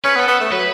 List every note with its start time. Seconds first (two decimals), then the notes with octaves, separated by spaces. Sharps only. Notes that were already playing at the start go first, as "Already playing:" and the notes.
0.04 C#4 B4
0.16 B3
0.19 A4
0.28 B3
0.40 A3
0.51 F#3 B4